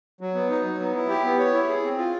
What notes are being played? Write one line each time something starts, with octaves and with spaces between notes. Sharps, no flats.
F#3
B3
D#4
F#3
B3
E4
G4
B3
C#5
E4
G#4
C4
F4